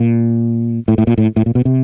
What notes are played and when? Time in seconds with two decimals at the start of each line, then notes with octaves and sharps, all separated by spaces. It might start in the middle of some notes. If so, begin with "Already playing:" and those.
Already playing: A#2
0.88 A2
0.98 A2
1.07 A#2
1.18 A2
1.36 A2
1.46 A#2
1.55 B2
1.65 C3